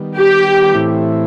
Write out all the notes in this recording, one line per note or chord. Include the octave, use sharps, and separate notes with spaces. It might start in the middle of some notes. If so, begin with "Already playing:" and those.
Already playing: D#3 G3 B3
G4
A2 E3 A3 C4 E4